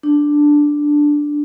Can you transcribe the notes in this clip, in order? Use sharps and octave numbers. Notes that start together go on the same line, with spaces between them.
D4